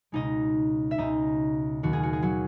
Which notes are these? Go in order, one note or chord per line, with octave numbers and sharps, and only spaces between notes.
C#2 B2 G#3 D#4 D#5
E5
C#2 B2 G#3 D#4 D#5
D#2 D#3 F#3 F#4
G#4
F#4
G#4
F#3 F#4